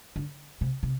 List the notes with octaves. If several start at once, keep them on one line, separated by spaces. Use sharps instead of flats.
D3
C3
C3